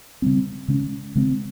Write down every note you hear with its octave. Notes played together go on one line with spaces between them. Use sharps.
C#3 G3 C4
C#3 G#3 C#4
C#3 G#3 C4